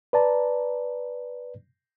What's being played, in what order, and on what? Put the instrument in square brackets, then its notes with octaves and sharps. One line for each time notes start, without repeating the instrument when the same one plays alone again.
[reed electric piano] B4 D5 A5 A#5